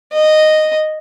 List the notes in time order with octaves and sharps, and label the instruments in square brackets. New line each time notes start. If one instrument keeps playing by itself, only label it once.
[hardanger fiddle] D#5